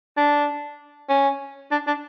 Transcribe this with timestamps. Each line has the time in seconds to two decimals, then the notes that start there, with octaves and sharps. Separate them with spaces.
0.17 D4
1.09 C#4
1.72 D4
1.87 D4